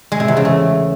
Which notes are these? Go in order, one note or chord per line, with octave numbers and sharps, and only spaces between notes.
G#3
C3
E2
C#3
A3